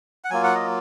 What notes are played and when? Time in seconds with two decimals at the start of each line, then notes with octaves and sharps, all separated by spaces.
0.24 F#5
0.31 F#3 A#3 F4 G#5
0.44 F#5
0.55 D#5